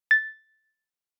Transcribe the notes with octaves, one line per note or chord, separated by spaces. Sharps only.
A6